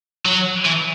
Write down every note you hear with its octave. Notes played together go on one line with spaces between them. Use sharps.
F#3
E3